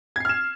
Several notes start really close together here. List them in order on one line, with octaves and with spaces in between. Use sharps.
G#6 C7 F6 E7